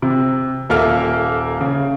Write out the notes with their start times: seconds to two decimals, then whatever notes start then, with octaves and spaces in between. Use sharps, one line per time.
0.02 C3
0.70 D#1 A#3 A4 E5 F6
1.61 C#3